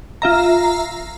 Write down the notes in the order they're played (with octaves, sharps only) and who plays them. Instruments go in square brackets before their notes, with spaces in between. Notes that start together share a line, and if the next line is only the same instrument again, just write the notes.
[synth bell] F4 E5 A#5